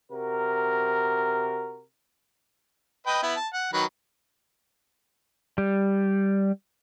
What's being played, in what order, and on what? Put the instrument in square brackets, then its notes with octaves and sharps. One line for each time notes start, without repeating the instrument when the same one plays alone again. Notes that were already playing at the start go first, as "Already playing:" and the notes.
[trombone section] C3 F#4 A#4
[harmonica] B4 D#5 G5
B3 E4
A5
F#5
D#3 F#3 B4
[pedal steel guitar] G3